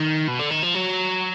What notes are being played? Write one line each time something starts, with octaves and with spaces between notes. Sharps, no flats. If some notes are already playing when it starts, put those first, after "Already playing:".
Already playing: D#3
B2
D3
D#3
F3
F#3